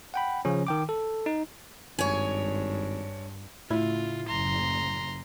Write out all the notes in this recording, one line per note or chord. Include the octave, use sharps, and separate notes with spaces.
F#5 G5 B5
C#3 F3 C#4
D#3 G5 D6
A4
D#4
G#1 G2 C#5 G#5
A2 C#3 E4 F4
F#1 A#5 C6